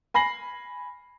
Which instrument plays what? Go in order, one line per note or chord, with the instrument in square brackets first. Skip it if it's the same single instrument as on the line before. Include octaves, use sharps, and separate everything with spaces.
[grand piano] G#5 B5 A#6 C7 F#7